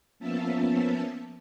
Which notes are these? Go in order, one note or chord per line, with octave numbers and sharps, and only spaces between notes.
F3 A#3 B3 C#4 E5 A5